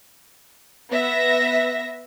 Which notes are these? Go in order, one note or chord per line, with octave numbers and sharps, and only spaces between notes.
B3 E5 A#6